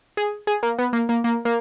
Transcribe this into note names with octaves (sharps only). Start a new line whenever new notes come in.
G#4
G#4
A#3
B3
A#3
A#3
A#3
A#3